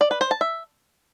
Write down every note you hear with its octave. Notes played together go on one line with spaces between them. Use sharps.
D5
B4
C5
A5
E5